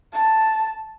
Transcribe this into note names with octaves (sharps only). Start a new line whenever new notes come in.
A5